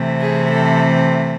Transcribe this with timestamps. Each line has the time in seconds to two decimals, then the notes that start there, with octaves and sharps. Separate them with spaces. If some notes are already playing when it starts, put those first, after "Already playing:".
Already playing: C3 E3 A3 C4
0.20 G#4
0.51 A4